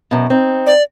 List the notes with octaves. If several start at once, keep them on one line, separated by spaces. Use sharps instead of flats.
F#2 B2
C4 D#4
D5